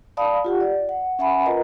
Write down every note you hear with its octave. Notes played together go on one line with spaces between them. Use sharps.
D5 F5 A5 B5 D#6
F4 G4 F#5
D5
F#5
C#4 E5 F#5 G#5 B5
F4 A#4 B4 D#5 A#5